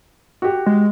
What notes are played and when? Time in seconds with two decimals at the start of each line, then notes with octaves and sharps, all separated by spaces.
0.42 F#4 G4
0.66 G#3